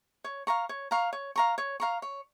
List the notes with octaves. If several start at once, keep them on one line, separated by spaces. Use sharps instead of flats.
C#5
F5 A#5 C#6
C#5
F5 A#5 C#6
C#5
F5 A#5 C#6
C#5
F5 A#5 C#6
C#5